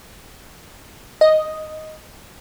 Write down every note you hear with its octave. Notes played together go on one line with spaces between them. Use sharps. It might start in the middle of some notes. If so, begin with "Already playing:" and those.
D#5